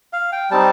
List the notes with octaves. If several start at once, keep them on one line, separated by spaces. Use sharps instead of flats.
F5
G5
G3 C4 D#4 A5